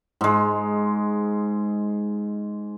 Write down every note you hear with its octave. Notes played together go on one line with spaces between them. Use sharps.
G#2 G#3